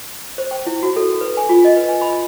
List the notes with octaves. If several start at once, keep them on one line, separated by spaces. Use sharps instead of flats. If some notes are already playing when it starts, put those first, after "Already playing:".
C5
G5
E4
F#4
A4
B4
G#5
F4
D#5
B4
G#5
B5